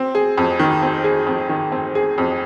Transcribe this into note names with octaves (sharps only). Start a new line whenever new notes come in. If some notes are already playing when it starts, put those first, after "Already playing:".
Already playing: C4
G#4
F2
D#3
C4
G#4
F2
D#3
C4
G#4
F2